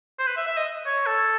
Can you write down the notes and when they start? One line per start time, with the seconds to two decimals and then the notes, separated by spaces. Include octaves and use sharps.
0.19 C5
0.27 B4
0.37 E5
0.47 E5
0.57 D#5
0.86 C#5
1.06 A4